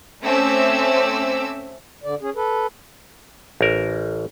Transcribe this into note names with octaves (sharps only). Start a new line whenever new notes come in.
A3 C4 C#4 E5 D6 E6
D3 D5
C#4 G#4
A4 B4
A1 A#4